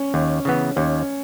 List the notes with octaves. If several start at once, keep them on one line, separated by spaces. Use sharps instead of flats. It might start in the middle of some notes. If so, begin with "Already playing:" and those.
Already playing: C#4
D#2
C#3 E3 B3
D#2 C#4